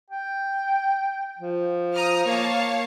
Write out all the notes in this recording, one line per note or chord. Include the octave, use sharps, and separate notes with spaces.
G5
F3
A#5 D#6 F6
A#3 C#5 F5 A5